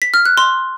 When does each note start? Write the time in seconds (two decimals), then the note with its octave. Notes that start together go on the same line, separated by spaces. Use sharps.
0.02 B6
0.14 F6
0.26 F#6
0.37 C6